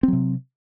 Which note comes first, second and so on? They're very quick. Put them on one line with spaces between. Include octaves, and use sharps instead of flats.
C4 F#3 C3